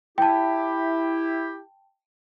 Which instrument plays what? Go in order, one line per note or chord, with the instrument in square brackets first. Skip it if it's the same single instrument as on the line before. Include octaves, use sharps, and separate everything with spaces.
[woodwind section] E4 G4 [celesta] G5 A5